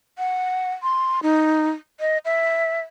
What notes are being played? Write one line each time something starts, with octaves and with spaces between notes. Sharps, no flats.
F#5
C6
D#4
D#5
E5